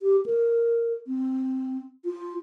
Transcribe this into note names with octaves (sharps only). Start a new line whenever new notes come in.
G4
A#4
C4
F4